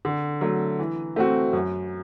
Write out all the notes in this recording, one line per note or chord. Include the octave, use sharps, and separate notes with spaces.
D3
F#3 A3
E3
A3 C4 F#4
F#2